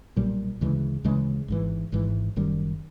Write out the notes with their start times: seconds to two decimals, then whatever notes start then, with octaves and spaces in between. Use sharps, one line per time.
0.16 B1 A#2 G3
0.61 D2 C#3 E3 G#3
1.04 D2 C#3 E3 G#3
1.48 G#1 G#2 E3
1.92 G#1 G#2 E3
2.36 F#1 F#2 D#3 G3